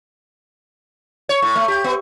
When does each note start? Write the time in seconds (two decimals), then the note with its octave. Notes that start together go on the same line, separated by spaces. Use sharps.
1.29 C#5
1.42 A2
1.56 A3
1.68 G4
1.84 B3